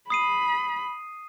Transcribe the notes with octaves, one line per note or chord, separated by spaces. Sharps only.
B5 D#6 C7 D#7